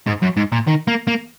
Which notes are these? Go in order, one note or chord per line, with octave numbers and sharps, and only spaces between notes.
G#2
F#2
G#2
A#2
D#3
A#3
A#3